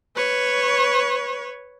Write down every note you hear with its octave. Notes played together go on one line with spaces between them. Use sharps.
B4 C#5